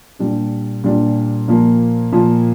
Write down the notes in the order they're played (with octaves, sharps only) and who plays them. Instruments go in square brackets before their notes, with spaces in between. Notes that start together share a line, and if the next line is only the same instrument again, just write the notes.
[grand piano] A#2 G3 D4
A#2 G3 D4
A#2 F3 A#3
A#2 F3 A#3